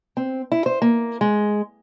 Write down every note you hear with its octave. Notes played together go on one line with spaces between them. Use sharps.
C4
E4
C5
A#3
G#3